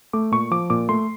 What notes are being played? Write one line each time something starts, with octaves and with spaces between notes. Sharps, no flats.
A3 D6
A#2 C#6
F3 D6
A#2 D6
A3 C6